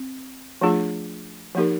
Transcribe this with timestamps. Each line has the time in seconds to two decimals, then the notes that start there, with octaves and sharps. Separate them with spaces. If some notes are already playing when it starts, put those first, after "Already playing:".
Already playing: C4
0.61 F3 A3 D4 F4 G#4
1.55 F3 A#3 D#4 G4 A#4